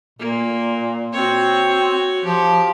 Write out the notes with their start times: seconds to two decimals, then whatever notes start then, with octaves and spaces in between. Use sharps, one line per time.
0.19 A#2 A#3
1.13 C4 F#4 C#5
2.25 F3 G4